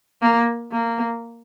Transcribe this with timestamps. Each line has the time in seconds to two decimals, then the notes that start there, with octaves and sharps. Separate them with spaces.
0.22 A#3
0.72 A#3